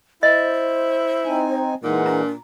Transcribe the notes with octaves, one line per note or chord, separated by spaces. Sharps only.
E4 C5 D#5
C4 D#4 G#5
A#2 E3 G#3 D#4 F#5
D4 A#5